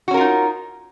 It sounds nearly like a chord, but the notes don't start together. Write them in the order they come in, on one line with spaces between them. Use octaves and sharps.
F#4 C#4 A#4 F4 D#4